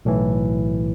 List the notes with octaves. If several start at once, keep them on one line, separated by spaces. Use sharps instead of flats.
B1 A2 E3